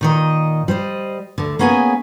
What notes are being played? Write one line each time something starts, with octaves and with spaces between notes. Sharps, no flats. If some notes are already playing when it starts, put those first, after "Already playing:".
A#2 D#3 D#5
G3 C5 D#5
D2 D3
A#3 B3 C#4 G#4 G#5